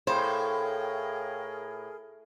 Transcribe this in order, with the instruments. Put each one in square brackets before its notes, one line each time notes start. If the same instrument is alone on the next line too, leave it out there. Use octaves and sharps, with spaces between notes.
[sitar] A2 [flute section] G#4 A#4 [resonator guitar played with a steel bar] C5 [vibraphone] F5 G5